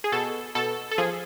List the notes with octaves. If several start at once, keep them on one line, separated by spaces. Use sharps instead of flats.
G#4
B2 A4
B2 A4
A4
F3 G#4